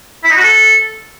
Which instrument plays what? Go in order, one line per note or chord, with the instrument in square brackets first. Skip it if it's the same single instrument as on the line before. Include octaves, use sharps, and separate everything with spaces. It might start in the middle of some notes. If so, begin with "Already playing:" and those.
[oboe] E4
D#4
F#4
A4